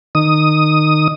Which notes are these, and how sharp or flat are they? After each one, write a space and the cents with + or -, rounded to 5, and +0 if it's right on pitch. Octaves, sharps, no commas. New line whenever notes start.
D#3 -15 D#6 +0